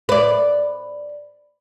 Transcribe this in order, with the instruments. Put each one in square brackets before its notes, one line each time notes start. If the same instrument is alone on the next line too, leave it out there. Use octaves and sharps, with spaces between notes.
[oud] B4 D5